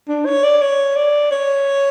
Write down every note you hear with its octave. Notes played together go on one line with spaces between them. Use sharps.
D4
C#5
D5
C#5
D5
C#5